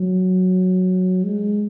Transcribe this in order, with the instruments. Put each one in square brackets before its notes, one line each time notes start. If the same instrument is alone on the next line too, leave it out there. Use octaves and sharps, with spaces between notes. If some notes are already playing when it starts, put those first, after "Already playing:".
Already playing: [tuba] F#3
G#3